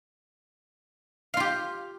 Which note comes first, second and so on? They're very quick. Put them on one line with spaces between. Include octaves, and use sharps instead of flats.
F5 F4 G4